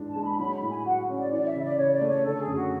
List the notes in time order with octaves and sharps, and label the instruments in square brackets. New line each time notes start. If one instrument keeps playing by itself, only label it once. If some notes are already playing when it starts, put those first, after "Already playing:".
Already playing: [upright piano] G#2 E3 D4
[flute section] A5
[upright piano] G#3
[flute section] B5
[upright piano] F#3 [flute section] B5
[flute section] B5
[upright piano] A2
[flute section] G#5
[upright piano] F#4 [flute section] F#5
[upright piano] C#4
[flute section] D5
[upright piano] E3 [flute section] D5
[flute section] E5
[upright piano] C#3
[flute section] D5
[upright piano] C#3 [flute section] C#5
[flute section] D5
[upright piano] A3
[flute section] C#5
[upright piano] D3 [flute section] A4
[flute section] G#4
[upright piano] F#2
[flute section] F#4